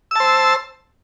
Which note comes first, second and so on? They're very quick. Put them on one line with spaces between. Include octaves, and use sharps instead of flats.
E6 A5 C5